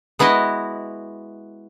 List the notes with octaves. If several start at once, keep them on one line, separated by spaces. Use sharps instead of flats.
G#3 B3 E4 F#4 D#5